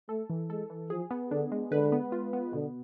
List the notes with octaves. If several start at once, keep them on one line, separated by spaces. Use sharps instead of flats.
A3 A4
E3
G#3 A4
E3
F3 G#4
B3
D3 D4
G#3
D3 B4
B3
F4
B3
B2 D3